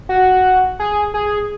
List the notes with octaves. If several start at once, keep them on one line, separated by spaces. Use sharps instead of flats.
F#4
G#4
G#4